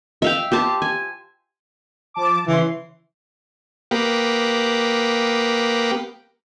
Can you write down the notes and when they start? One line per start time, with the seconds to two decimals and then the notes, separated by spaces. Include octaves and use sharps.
0.22 E5 F5 G5
0.52 G4 C5 A5
0.82 G#5
2.14 F3 A5 D6
2.47 C#3 E3 C#4 C6
3.91 A#3 B3 G4